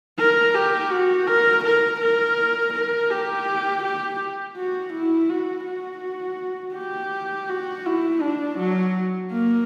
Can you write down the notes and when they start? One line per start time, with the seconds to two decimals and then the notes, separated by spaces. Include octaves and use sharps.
0.19 A#4
0.54 G4
0.91 F#4
1.27 A#4
1.64 A#4
2.01 A#4
2.74 A#4
3.10 G4
3.84 G4
4.57 F#4
4.93 E4
5.29 F#4
5.66 F#4
6.75 G4
7.49 F#4
7.86 E4
8.22 D4
8.59 F#3
9.31 A#3